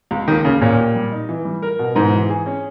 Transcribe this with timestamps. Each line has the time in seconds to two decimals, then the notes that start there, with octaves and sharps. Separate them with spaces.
0.11 C#2
0.28 D#2 D#3
0.44 D#2 C#3
0.61 A#2 C#4
0.78 G4
0.95 G3
1.12 D#4
1.29 E3
1.45 G3
1.62 A#4
1.79 B2
1.95 G#2 E3
2.12 E3
2.29 G#4
2.46 C#4